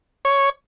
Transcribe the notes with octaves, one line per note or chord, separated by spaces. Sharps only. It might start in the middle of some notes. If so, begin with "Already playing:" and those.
C#5